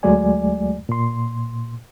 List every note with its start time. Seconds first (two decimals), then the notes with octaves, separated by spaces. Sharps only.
0.03 D2 F#3 G#3 A3 D5 G#5
0.89 A#2 C6